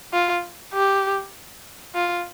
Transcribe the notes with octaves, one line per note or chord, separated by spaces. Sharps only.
F4
G4
F4